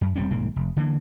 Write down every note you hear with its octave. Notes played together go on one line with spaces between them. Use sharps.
F#2
E1 G3 C4 C#4
D#1 B1 G#2 A#3
F1
D3 E3 A#3